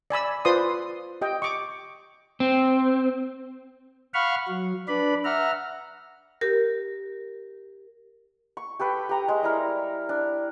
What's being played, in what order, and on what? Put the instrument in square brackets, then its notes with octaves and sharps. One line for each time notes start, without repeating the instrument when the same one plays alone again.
[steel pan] D5 G#5 B5 E6
F4 B4 C5 D5 C6 D#6
G4 D#5 G5
C#6 D6
[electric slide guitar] C4
[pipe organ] F5 F#5 B5 C#6 F6
F#3
D4 B4 D5 B5
E5 F#5 A#5 F6
[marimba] G4 A#4
[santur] C#6
G4 A4 B4 G5
G4 A#5
G#3 G#4
G3 E4 A#4
D4